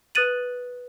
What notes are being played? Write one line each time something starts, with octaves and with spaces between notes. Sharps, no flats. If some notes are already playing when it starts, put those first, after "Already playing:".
B4 D#6 F#6 A6 D#7 F#7